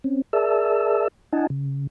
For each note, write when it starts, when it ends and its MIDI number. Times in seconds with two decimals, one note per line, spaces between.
0.04 0.22 60
0.04 0.22 61
0.33 1.08 68
0.33 1.08 70
0.33 1.08 74
0.33 1.08 76
0.33 1.08 81
0.33 1.08 88
1.32 1.47 62
1.32 1.47 64
1.32 1.47 75
1.32 1.47 78
1.32 1.47 80
1.32 1.47 81
1.50 1.87 49